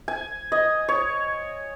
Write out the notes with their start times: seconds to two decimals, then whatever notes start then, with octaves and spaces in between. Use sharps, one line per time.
0.08 G#5
0.52 D#5
0.89 C#5